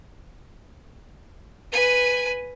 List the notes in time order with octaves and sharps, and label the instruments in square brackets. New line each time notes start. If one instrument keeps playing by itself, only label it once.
[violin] B4 G#5